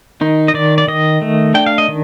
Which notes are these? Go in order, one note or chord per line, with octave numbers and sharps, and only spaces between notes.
D#3 D#4
D#5
D#3 D5
D5
D#3 D#5
A3
D4 G5
F5
D#5
D#3